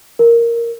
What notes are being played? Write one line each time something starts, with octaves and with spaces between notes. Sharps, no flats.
A#4